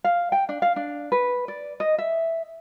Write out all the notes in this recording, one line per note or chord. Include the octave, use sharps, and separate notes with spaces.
F5
G5
D4
F5
D4
B4
D5
D#5
E5